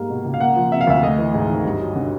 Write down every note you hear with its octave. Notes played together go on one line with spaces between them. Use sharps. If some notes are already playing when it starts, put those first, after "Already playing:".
Already playing: G#2 G3 A#3 F5
B2
C#2
F5
A#3 F#5
F3
C3 E5
F5
D2 E5
A3 D#5
E3
G#2
G#1
G2
F#3
D3